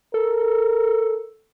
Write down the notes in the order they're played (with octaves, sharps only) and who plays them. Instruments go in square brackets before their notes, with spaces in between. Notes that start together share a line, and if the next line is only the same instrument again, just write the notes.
[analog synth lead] A4 [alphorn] A#4